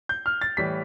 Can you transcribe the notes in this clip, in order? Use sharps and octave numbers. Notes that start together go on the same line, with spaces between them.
G6
F6
A6
A2 E3 G3 B6